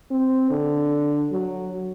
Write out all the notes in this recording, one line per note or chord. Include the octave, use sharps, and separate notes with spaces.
C4
D3
F#3